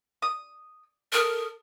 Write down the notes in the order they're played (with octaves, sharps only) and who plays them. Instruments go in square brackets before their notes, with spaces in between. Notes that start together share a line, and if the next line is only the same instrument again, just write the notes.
[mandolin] D#6
[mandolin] A4 D#6 F6 [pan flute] A#4